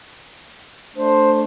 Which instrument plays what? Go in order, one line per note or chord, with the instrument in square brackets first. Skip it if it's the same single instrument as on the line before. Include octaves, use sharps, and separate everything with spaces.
[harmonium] A3 D4 [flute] C5